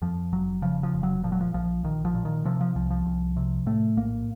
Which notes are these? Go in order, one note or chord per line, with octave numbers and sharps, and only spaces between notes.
F2 F3
F1 F#3
C#3 F3
F3
F1
F#3
A#2 F3
F#3
F3
A#1 F3
A#1 D#3
F3
A#2
D#3
C3 F3
F3
C2 F3
F3
C2
C3
A2 A3
A#1 A#3